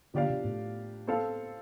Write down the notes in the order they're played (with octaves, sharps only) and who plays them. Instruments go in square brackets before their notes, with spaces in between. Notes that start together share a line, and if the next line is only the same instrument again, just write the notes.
[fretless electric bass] D3 [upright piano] F3 D4 G4 D5 F5
[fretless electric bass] C3
A2
[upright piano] C4 A4 F5